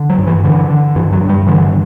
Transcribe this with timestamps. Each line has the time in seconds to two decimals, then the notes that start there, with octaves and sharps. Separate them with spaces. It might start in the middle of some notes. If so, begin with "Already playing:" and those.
Already playing: D3
0.10 F#3
0.19 G2
0.27 E3
0.44 D3 E3
0.70 D3
0.96 G2 E3
1.12 F#3
1.21 G2
1.29 G3
1.46 D3 E3